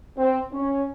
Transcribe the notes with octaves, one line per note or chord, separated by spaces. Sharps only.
C4
C#4